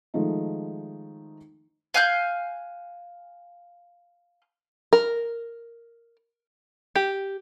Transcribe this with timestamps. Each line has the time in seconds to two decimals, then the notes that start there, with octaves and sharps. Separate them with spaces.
0.14 D#3 F3 G#3 A3 D#4
1.94 F5 G#5 F#6 G6
4.93 A#4
6.96 G4